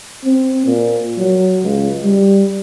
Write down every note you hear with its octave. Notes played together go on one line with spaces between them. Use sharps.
C4
A#2
F#3
C#2
G3